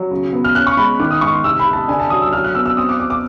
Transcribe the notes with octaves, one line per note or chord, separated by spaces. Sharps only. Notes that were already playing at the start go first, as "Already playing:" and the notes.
Already playing: F#3
C#3
B3
F6
C#4 F#6
C#6
G#3 B5
D#3 D6
D#6
G#2 C#6
C6
C3 E6
B5
C3
A5
D3 G#5
A5
F#3 D#6
E6
F#3 F6
F#6
B3 E6
E6
C4 D#6
D6
C4 D6
D6